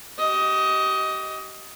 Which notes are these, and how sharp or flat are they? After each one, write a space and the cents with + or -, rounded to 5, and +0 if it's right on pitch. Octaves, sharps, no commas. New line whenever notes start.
G4 -35 D#5 +15